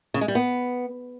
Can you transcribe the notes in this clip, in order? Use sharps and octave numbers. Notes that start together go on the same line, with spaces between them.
C#3
G#3
G3
B3